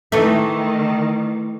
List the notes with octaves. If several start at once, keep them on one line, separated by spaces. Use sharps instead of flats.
D#3 E3 A3